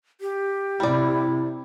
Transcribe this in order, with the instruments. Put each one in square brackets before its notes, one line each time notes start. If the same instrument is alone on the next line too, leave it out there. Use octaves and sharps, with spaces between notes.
[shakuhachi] G4
[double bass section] C3 [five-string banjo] G3 D5 [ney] E4